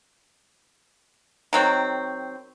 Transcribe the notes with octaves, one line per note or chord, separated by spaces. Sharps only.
D#3 F#3 C4